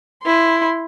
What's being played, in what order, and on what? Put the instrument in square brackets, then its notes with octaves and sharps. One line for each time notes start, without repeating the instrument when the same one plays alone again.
[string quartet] E4 C6